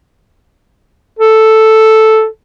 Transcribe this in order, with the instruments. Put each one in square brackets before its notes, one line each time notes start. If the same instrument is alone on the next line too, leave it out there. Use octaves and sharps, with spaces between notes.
[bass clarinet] A4